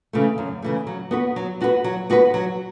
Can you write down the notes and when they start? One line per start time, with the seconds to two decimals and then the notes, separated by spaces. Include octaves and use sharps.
0.13 C#3 E3 A3
0.38 F#2
0.62 C#3 E3 A3
0.87 F#3
1.11 B3 F#4 B4
1.36 F#3
1.61 B3 F#4 B4
1.84 F#3
2.10 B3 F#4 B4
2.34 F#3